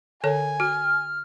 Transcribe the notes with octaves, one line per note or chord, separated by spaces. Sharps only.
D3 A4 C#5 G#5
F#4 F6